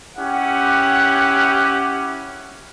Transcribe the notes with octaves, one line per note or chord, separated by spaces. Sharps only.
C#4 E4 G4 F#5